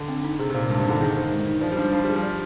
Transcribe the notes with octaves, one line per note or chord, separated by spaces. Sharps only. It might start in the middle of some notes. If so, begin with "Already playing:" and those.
Already playing: D3
C4
D#4
C3 G#4
C3
A#2 C5
G2 G#3
C3 D#4
D3
D#3 G#4
C5
G#3
D#4
F3 D5
G3
F3 D4
F3 D4
G3 G#4
F3
D5